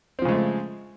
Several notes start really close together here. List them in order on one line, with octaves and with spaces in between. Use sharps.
C4 F3 C#3 G#3 A3